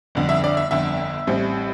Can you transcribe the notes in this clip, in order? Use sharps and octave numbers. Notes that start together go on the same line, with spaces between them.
G1 F2 D3
E5
D5
E5
G1 F2 D3 E5
A1 A2 G3 C4